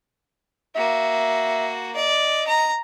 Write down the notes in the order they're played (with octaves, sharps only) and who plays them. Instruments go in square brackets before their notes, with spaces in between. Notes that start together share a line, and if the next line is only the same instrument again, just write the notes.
[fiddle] A#3 F#4 [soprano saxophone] E5
[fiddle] D5 [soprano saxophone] D#5
[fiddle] A#5